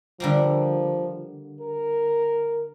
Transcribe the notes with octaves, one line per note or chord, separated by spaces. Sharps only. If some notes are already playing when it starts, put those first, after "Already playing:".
D3 F3 G3 A#3
A#4